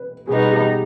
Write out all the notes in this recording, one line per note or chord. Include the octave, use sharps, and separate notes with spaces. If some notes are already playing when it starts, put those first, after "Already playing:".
Already playing: B4
B2 G3 B3 D#4 G#4
G4